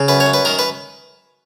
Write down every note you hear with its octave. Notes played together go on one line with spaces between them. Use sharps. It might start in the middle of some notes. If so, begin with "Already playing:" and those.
Already playing: C#3
F#2 B4
C#5
F#2
B4
D#3 A#4
B4